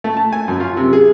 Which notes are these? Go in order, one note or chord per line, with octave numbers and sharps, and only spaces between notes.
A3
A5
G#5
F#2
F4
C3
G#4